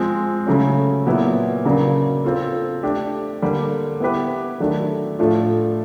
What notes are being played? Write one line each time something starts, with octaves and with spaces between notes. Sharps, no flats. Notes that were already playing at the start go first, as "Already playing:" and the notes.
Already playing: F3 G#3 C4
C#3 F#3 A3 C#4
A#2 F#3 B3 E4
C#3 F#3 A#3 D4
C4 F4 A4
A3 D4 G4
D3 G3 A#3
B3 E4 G4 B4
D#3 F#3 A3 D4
A2 F3 A3 D4 F4